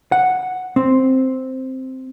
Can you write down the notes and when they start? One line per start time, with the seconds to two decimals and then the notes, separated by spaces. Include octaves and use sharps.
0.12 F#5
0.76 C4